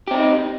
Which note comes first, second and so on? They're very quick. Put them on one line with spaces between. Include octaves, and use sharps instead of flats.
G4 C4 D4 D#4